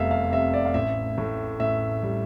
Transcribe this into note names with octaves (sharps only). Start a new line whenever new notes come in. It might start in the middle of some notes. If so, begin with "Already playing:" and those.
Already playing: F1 E2 G3 E5 F5
F5
C3 E5
D5
F5
A1 E5
A2
A1 E5
G3